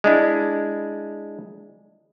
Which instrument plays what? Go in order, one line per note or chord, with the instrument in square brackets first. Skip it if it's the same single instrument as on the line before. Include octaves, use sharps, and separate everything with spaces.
[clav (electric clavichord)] G#3 D4 E4